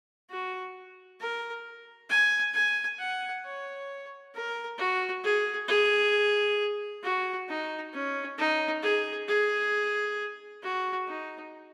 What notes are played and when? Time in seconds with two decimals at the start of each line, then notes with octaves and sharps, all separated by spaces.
0.30 F#4
1.20 A#4
2.09 G#5
2.54 G#5
2.99 F#5
3.44 C#5
4.34 A#4
4.78 F#4
5.24 G#4
5.68 G#4
7.03 F#4
7.48 D#4
7.93 C#4
8.38 D#4
8.83 G#4
9.28 G#4
10.63 F#4
11.07 D#4